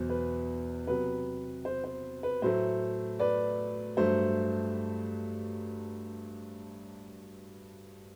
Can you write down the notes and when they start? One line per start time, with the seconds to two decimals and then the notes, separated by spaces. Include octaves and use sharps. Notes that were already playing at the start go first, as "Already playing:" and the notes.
Already playing: E2 B2 F#3 C5
0.10 B4
0.87 C3 F#3 B3 B4
1.65 C5
1.84 C5
2.23 B4
2.42 A2 F#3 A3 C5
3.20 B4 D5
3.97 G2 F#3 A3 C5